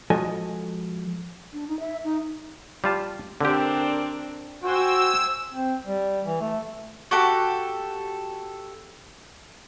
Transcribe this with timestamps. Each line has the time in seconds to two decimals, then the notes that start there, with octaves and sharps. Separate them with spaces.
0.10 F3 G#3 F#4 A4 D#5 G#5
1.53 D4
1.68 D#4
1.80 E5
2.04 D#4
2.84 G3 F4 A5
3.41 D3 C4 D4 G4 A#4
4.63 F#4 C5 G5 G#5 E6
5.53 C4
5.87 G3
6.25 E3
6.41 A3
7.11 F#4 G4 A4